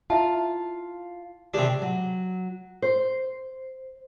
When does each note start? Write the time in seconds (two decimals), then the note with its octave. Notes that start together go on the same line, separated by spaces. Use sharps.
0.10 E4 F4 E5 F5 A5
1.54 C3 D#3 D4 G4 G#4
1.82 F#3
2.82 C5